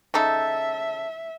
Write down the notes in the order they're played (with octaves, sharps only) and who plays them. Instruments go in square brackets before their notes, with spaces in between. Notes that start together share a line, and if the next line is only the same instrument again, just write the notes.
[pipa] C#3 D#4 A4 [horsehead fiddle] E5